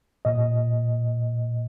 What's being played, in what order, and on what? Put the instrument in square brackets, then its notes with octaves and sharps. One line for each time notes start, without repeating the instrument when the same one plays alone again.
[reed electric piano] A#2 D#5